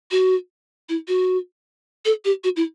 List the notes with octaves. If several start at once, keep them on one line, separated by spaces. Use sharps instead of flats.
F#4
E4
F#4
A4
G4
F#4
E4